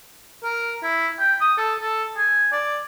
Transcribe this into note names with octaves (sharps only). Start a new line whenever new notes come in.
A#4
E4
G5
D#6
A4
A4
G#5
D5